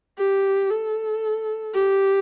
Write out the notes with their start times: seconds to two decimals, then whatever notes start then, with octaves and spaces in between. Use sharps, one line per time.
0.18 G4
0.70 A4
1.74 G4